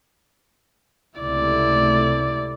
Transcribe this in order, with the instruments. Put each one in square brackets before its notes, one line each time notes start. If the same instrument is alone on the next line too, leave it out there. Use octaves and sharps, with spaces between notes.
[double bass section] C#2 C3 A3 [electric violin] E4 D5